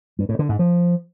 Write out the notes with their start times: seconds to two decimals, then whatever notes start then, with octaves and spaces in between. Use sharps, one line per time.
0.19 G2
0.29 A2
0.39 D3
0.49 G#2
0.59 F3